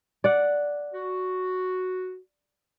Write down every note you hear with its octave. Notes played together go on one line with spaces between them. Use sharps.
D5 F#5
F#4